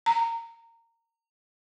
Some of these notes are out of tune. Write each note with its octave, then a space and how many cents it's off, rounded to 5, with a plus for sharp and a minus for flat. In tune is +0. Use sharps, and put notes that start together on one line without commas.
A#5 -20